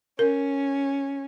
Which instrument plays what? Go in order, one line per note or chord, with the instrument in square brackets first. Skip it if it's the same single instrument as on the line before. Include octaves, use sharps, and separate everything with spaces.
[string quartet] C#4 [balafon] A#4